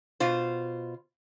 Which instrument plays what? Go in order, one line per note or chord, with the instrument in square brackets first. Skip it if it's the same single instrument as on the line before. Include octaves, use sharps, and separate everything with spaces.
[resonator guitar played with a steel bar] B2 F4 C5